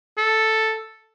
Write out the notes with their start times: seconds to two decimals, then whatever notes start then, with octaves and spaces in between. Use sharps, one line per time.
0.18 A4